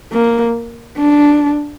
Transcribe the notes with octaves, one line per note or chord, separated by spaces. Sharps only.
A#3
D4